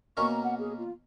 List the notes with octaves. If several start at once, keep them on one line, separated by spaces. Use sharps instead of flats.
B2 A#3 C#4 F#4 A#4 C#6
A#5
F#5
G#4
F4